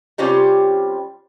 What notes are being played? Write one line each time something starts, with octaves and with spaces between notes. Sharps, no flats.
C3 G3 C#4 F4 C5